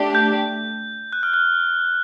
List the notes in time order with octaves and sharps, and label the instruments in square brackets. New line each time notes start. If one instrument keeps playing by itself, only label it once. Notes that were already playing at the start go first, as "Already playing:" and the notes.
Already playing: [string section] A3 D4 G4
[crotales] G6
F#6
F6
F#6